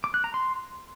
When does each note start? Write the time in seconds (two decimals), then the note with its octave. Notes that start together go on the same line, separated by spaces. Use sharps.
0.04 D6
0.14 F#6
0.24 A#5
0.34 C6